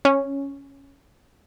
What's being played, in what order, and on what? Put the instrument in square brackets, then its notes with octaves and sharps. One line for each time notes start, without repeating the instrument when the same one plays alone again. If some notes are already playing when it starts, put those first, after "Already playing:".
[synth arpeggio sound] C#4